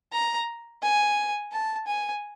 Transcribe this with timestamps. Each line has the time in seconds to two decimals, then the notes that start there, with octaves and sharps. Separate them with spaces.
0.13 A#5
0.83 G#5
1.52 A5
1.87 G#5